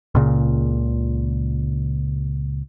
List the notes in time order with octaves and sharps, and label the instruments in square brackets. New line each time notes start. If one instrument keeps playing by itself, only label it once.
[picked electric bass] C#2 A#2 C#3